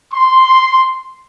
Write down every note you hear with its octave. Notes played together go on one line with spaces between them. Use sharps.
C6